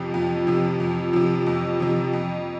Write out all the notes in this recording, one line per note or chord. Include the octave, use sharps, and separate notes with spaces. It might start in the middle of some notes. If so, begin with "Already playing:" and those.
Already playing: F2 C3 F3
F2
C3 F3
F2
C3 F3
F2
C3 F3
F2